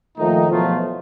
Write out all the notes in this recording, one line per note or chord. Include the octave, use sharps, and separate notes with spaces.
A#2 D#3 F3 A3 D#4
E2 B2 F3 F#3 A3 F4